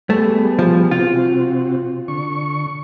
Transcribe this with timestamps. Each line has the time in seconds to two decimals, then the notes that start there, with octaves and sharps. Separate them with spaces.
0.10 G3 A3 B3 G#4
0.59 F3
0.91 C3 C4 F4 F#4
2.08 D3 C#6